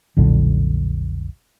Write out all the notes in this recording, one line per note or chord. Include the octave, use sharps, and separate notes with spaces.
F1 B1 A#2 D3